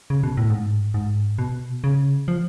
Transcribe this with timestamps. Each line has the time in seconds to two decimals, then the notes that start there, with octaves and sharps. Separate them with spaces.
0.10 C#3
0.23 B2
0.37 A2
0.50 G#2
0.94 G#2
1.38 B2
1.84 C#3
2.28 F3